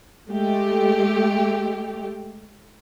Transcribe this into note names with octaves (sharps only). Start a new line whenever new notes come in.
G#3 A3 G4